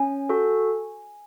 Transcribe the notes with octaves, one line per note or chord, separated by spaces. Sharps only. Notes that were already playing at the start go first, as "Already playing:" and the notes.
Already playing: C#4 G#5
F#4 A4